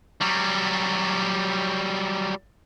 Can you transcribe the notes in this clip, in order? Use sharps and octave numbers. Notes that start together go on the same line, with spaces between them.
F#3 G3